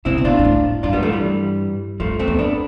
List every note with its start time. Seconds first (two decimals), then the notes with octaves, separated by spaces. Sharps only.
0.05 C3 C4 E4
0.18 C3
0.25 B2 D4 F4
0.39 G2
0.45 A2
0.83 G2 D4 F4
0.93 G3 B3
1.03 F3 A3
1.13 E3 G3
2.00 G2 F3 A3
2.19 F2 A3 C4
2.28 E2
2.39 B3 D4